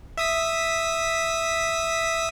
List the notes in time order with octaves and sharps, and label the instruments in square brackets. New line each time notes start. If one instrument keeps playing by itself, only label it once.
[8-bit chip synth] E5 D#6 B6